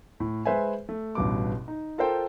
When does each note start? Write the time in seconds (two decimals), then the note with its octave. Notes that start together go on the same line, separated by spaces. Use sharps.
0.20 A2
0.45 G#3 B4 C5 E5 G#5
0.89 A3
1.15 A1 G2 B2 D6
1.68 D#4
1.98 F4 A4 A#4 C5 G5